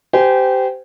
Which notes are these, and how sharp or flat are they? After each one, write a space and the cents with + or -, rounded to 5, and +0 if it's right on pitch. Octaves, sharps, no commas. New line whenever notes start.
G4 -15 C5 -30 G#5 +0